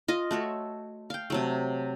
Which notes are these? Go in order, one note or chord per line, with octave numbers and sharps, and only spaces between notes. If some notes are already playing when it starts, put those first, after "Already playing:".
F4 D#5
A3 F#4 A4 C#5
F5 G5
C3 F#3 A3